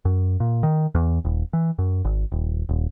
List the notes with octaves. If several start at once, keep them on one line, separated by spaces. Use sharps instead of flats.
F#2
A#2
D#3
E2
D#1
E3
F#2
G#1
D#1
D#1